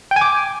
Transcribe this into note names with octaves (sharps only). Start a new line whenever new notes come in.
G5
G#5
D6